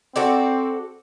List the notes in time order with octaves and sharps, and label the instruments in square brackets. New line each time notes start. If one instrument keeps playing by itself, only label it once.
[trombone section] C4 [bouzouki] F#4 A4 D5